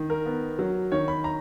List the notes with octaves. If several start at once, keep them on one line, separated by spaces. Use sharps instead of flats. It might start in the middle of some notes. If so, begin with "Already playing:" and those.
Already playing: D#3
A#4
B3
F#3
D#3 C#5
B5
A#5